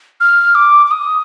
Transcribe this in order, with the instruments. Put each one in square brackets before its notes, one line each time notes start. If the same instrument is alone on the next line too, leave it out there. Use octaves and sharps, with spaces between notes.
[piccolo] F6
D6
D6
D#6